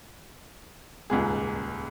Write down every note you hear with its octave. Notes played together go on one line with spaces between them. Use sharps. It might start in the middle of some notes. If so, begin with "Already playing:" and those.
D#1 C#2 G#2 G#4